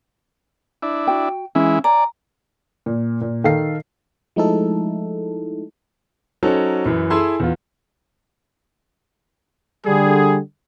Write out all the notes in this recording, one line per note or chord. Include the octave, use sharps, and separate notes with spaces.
D4 E4
F#4 G5
E3 G#3 C#4 E4 F5
C#5 D5 G#5 A#5
A#2
A#2
D#3 A4 F5 C7
F3 G#3 A3 D#4 E4 A4
F#3 C#4 D#4 A4 C5
F#2 E3
E4 G#4 A4 G#5 C6 E6
E2 F4
D3 G3 G#4